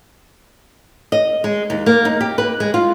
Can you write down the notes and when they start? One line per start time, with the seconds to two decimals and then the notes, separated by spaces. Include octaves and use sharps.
1.12 D#5
1.44 G#3
1.70 D#2
1.86 A#3
2.05 D#4
2.21 G4
2.38 B4
2.60 G#3
2.74 F4